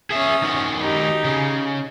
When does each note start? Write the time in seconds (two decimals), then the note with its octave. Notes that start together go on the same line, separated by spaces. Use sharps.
0.10 C#4 G#4 E5 D#6
0.43 D#3 F#4
0.80 D#4 G4
1.24 C#3